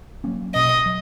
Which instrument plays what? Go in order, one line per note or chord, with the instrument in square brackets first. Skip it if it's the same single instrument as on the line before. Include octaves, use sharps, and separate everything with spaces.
[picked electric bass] F#3 A#3 C#4
[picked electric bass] B2 [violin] D#5
[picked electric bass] F#3